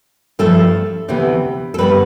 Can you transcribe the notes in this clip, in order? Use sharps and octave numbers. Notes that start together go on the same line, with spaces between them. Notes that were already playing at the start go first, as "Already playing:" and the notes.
G2 F3 A3 A4
D2 C3 E3 B3
A4
G2 D3 G3 B3 B4